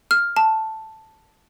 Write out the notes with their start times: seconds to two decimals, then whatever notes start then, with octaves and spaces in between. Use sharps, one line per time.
0.11 F6
0.37 A5